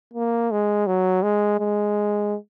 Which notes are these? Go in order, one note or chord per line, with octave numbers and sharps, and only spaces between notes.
A#3
G#3
F#3
G#3
G#3